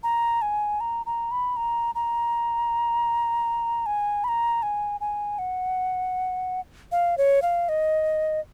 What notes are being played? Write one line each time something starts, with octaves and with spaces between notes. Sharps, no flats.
A#5
G#5
A#5
A#5
B5
A#5
A#5
G#5
B5
A#5
G#5
G#5
F#5
F5
C#5
F5
D#5